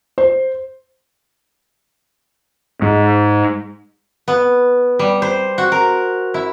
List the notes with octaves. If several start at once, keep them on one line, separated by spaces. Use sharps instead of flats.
C5
G#2
B3
G3
C5
F#4
A#4
E4